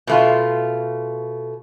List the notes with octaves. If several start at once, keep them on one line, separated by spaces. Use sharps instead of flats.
B2 A3 F4